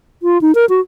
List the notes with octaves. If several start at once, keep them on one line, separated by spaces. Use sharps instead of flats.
F4
D#4
A#4
F#4